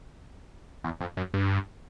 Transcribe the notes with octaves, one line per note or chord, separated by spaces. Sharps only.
E2
F2
F#2
G2